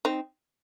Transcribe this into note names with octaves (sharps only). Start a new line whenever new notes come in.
C4 D#4